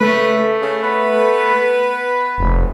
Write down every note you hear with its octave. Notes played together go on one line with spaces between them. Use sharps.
C#3 A3 B4
C#3
B3 B4
F1